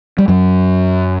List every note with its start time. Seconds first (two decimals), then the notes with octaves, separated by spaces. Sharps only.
0.18 G3
0.28 F#2 F#3